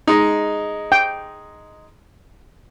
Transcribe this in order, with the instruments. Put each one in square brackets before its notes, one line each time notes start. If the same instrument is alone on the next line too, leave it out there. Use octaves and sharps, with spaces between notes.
[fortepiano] G#3 D#4
[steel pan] G5